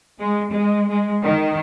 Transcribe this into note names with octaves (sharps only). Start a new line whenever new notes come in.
G#3
G#3
G#3
D#3